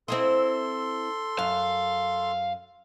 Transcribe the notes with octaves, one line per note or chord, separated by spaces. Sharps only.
C4 E4 A4 D#5 C6
F#2 F5